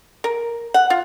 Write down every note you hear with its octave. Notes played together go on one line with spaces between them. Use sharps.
A#4
F#5
F4